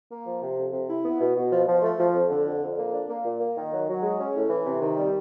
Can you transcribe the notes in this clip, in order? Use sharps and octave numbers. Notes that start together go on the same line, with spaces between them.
A#3
F3
C3
F2
C3
E4
B3
B2
B2
F3
F3
A3
F3
F2
D3
F2
F2
A#3
D4
A#3
A#2
A#3
D#3
F#3
F#3
G#3
C#4
A2
E3
C3
D#3
G3